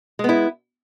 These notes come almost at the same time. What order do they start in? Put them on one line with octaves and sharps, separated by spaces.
G#3 B3 E4